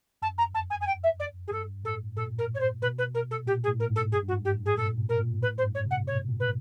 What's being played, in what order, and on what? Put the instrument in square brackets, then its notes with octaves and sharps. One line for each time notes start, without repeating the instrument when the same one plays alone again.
[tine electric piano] F#2 [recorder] A5
[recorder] A#5
[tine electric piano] F2 [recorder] A5
[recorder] G#5
G#5
G5
E5
D5
G#4
[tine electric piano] G2 [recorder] A4
[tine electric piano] A2 [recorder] A4
[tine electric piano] A#2 [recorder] A4
[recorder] A#4
C#5
C5
[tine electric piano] B2 [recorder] B4
[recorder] B4
A#4
A4
[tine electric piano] A#2 [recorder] G4
[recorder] G#4
[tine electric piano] A2
[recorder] A#4
[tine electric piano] G#2
[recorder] A4
[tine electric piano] G2 [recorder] G#4
[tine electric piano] G2
[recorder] F#4
[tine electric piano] G#2
[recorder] G4
[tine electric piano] A2
[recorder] G#4
[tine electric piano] A#2 [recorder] A4
[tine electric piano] B2
[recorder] A#4
[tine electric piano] A#2
[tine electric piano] A2 [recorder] B4
[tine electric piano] G#2 [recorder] C5
[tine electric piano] G2
[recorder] C#5
[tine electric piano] C3
[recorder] F#5
[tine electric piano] B2 [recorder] C#5
[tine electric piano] A#2
[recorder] B4